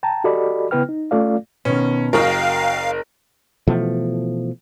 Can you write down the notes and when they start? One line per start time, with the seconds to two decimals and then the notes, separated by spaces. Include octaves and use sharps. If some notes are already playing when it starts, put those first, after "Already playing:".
0.03 G5 A5 A#5
0.24 F#4 G4 A4 D5 D#5 B5
0.71 C#3 B3 E4 B4 G5 F6
0.89 D#4
1.11 A3 C#4 F4 A4 D5 F5
1.65 B2 D#3 C#4
2.13 F#1 F#4 A#4 D#5 F5 G5
3.68 B2 E3 F3 A3